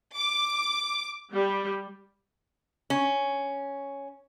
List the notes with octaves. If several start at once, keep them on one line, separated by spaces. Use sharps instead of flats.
D6
G3
C#4